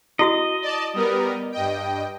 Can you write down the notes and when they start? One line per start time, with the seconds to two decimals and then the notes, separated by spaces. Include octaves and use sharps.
0.19 E4 F#4 D#5 D#6
0.62 D5 A5
0.94 G3 B3 A#4
1.52 G2 D#5 G5